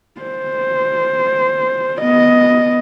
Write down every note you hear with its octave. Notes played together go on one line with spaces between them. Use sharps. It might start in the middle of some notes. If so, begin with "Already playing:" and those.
C5
B3 D#5